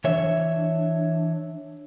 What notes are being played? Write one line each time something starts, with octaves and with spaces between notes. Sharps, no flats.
E3 D4 C#5 E5